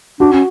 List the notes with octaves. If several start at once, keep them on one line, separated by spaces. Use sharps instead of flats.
D4 F#4
C#4